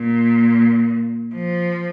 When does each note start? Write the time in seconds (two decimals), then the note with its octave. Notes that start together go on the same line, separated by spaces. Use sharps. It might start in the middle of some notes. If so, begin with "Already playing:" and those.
Already playing: A#2
1.34 F3